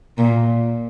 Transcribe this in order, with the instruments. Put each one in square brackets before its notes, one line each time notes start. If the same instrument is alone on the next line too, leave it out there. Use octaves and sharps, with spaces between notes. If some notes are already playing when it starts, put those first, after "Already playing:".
[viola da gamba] A#2